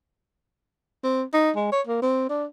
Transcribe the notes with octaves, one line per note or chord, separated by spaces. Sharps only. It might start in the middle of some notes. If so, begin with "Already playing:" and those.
C4
D#4
G#3
C#5
A#3
C4
D4